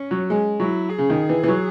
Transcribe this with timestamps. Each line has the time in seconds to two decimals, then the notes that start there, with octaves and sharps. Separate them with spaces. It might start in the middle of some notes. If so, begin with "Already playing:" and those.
Already playing: C#4
0.11 F#3
0.30 G#3
0.60 F#3 E4
0.89 G#4
0.98 C#3
1.10 D#3
1.29 E3
1.43 E3
1.48 F#3